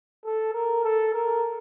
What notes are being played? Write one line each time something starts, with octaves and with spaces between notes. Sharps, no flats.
A4
A#4
A4
A#4